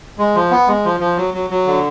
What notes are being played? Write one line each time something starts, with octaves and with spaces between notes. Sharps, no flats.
G#3
F3
B3
G#3
F3
F3
F#3
F#3
F#3
D3